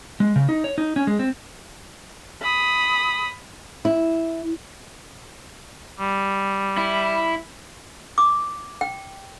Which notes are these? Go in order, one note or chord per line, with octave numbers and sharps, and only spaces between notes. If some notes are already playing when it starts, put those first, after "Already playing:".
G#3
C#3
D#4
C#5
D#4
C#4
G#3
C4
B5 D#6
E4
G3
E4
D6
G5